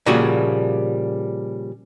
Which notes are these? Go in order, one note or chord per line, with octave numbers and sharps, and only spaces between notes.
A#2 C#3 F3 G3 F#4 G#4